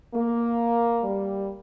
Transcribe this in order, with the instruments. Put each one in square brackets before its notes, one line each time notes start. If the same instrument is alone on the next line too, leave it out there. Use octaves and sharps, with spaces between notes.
[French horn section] A#3
G3